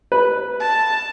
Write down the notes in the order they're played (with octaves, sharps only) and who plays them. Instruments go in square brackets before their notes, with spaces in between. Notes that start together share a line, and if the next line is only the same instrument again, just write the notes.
[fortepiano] B4
[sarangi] A5